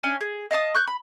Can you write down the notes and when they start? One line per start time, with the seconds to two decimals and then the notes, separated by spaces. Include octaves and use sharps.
0.03 C#4 D4 G#5
0.21 G#4
0.51 D#5 F5 A5 D#6
0.74 C#6 F#6 G6
0.87 B5